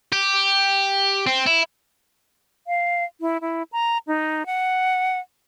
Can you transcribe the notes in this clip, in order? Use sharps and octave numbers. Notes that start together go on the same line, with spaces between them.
G4
C4
E4
F5
E4
E4
A#5
D#4
F#5